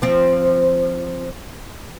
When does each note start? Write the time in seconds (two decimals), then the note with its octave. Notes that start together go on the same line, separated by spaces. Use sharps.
0.02 F3 C4